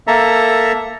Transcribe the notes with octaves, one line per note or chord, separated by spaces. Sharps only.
A#3 A4 E5 A#5